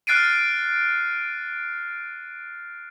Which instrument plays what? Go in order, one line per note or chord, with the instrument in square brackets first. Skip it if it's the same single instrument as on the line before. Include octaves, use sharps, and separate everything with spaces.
[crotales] F6 F#6 A6 C7 D7 D#7